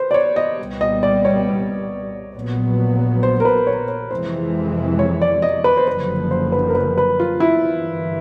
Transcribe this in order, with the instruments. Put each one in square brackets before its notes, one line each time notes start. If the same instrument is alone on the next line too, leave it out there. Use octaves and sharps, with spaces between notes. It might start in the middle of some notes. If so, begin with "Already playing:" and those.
Already playing: [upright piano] B4 C5
D5
C#5
D#5
[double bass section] C2 A#2 G3 B3
[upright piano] D#5
D5
C#5
[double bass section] A#1 A#2 F#3 B3
[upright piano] C5
A#4
B4
C#5
C#5
[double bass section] F2 C3 E3 G#3 [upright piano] C5
[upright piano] C#5
D5
D#5
B4
C5
[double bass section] F#1 F#2 D3 F3 [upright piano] B4
[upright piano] C5
B4
A#4
B4
B4
F4
E4
[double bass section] G1 G2 E3